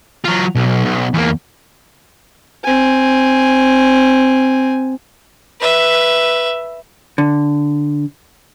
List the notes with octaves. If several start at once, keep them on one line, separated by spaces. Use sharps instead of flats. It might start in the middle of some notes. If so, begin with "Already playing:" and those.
F#3 F4
B1
B1
E2 A#3
C4 G#5
B4 E5
D3